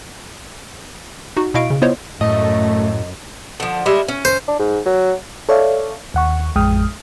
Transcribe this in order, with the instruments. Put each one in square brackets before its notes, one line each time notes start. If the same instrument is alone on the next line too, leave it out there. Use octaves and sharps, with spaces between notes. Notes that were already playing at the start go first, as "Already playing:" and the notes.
[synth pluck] D#4 F#4
B2 E4 D#5 F5 C#6 D7
C#3
B3 E4 F4 C5 C#5 D#5
[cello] F#2 [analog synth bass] A2 [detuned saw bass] A3 [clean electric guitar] D#5
[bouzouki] D3 F3
G3 G#3 E5
C#4
[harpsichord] C5
[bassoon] D4
G#2
F#3
[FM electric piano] A4 C#5 D5 E5 F5
D#2 F#5 C#6
A1 F2 G#3 G5 D#6 F6